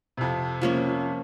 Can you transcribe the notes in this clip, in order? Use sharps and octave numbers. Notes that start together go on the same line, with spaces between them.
F2 C3
F3 A#3 C#4